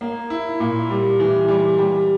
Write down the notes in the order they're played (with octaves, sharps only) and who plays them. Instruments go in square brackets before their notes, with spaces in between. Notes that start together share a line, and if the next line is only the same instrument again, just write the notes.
[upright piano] A#3
E4
A#2
G3
E3
G3
G3